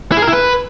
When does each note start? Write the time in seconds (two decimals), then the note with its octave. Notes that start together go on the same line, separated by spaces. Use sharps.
0.12 E4
0.17 G#4
0.22 A#4
0.27 E4
0.33 B4